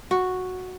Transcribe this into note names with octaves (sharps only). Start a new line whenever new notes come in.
F#4